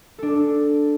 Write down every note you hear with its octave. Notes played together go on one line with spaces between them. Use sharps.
D4 A4